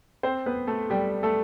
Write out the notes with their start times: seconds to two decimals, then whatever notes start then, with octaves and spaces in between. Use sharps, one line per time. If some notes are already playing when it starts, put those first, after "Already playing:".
0.23 C4 C5
0.46 B3 B4
0.67 A3 A4
0.90 G3 G4
1.23 A3 A4